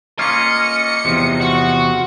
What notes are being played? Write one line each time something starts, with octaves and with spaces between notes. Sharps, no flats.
A#3 C#4 F4 D#5 C#7
E2 C3 F3
F#4